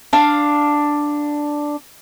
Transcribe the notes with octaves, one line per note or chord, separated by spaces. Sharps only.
D4 F5